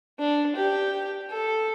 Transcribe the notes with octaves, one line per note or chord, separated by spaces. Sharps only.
D4
G4
A4